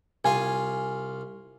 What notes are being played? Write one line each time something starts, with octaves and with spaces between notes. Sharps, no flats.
C2 F4 F5 G#5